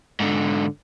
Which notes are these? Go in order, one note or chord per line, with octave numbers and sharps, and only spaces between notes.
G#2 D3